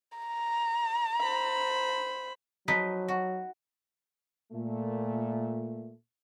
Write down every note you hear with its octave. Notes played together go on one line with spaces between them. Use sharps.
A#5
C5 B5
F3 F#3 D#4 B4
F#4
A#2 A3